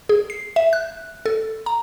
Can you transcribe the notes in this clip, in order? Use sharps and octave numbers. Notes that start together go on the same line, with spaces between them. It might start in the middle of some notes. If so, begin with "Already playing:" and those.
G#4
C7
E5
F#6
A4
A#5